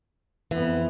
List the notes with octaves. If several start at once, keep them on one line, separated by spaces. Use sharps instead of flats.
F2 E3 B3